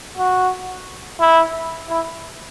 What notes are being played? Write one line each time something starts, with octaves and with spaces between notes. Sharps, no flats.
F#4
E4
E4